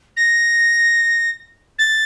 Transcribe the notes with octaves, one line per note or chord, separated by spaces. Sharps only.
A#6
A6